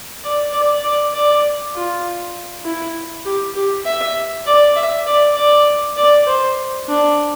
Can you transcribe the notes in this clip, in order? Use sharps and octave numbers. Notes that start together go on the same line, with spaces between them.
D5
D5
D5
D5
F4
E4
G4
G4
E5
D5
E5
D5
D5
D5
C5
D4